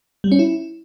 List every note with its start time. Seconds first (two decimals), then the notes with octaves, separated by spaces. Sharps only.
0.24 G3
0.32 C#4
0.39 E4